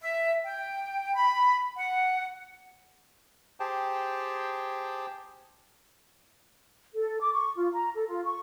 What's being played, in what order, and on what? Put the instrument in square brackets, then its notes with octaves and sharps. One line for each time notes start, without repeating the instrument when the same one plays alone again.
[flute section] E5
G5
B5
F#5
[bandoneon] G4 G#4 C5 G5 A5
[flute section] A4
D6
C#6
F4
A#5
A4
F4
C#6